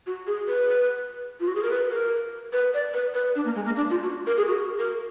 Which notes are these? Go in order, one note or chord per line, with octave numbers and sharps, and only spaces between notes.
F#4
G#4
B4
F4
F#4
G#4
A#4
B4
A#4
B4
D5
B4
B4
D4
A#3
G#3
A#3
D4
F4
F#4
A#4
G#4
F#4
A#4